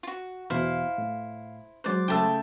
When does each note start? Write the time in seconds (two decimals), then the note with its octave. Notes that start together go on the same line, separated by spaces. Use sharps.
0.03 F4 F#4
0.50 E2 B2 E3 E4 C5 F5
0.98 A2
1.84 F#3 G#3 C5 D5 F#6
2.08 C#3 A3 G5 A5 E6